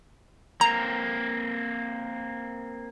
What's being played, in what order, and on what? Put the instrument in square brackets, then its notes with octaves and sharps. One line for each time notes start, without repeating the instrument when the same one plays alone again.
[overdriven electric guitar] A#3 C4 [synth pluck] A#5